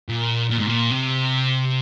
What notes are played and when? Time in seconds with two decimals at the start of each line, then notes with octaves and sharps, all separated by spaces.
0.09 A#2
0.50 A#2
0.58 G#2
0.67 A#2
0.91 C3